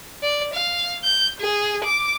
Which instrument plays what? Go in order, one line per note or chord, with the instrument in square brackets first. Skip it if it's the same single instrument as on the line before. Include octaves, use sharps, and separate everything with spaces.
[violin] D5
F5
G6
G#4
D6